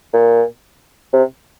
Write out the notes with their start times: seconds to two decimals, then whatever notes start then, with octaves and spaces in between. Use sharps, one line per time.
0.13 A#2
1.13 C3